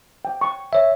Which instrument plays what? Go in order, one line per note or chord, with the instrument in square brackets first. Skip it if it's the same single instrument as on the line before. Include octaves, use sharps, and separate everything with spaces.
[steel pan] G5
C#6
[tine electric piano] C#5 E5